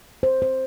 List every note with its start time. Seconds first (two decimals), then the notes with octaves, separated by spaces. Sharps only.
0.23 C5
0.42 C5